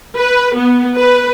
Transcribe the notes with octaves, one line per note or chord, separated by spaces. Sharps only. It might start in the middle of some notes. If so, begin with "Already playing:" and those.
B4
B3
B4